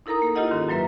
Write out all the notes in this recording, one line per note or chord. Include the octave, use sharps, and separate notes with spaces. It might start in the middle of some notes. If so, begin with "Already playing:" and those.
D#4 E4 A4 A#4 A#5 D#6
A#3
E4 F4 G4 A4 D#5 F#5
G#2 D#3 C#4
F#2 F#3 A#3 B4 E5